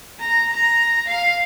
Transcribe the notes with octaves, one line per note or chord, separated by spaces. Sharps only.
A#5
A#5
F5